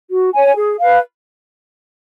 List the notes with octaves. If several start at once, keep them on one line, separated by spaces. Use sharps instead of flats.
F#4
C#5 G#5
G#4
B4 F5